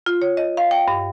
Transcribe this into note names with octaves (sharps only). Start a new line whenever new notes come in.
F4
C#5
D#5
F5
G5
G2